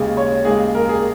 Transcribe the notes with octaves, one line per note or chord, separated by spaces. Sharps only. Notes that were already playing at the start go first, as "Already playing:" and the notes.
Already playing: D#2 C#3 G#3
C#5
D#2 C#3 G#3 G#4
A#4
G#4